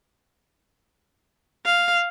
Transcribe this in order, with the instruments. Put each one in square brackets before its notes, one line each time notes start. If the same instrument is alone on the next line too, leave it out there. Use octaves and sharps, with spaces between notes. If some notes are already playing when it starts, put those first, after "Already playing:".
[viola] F5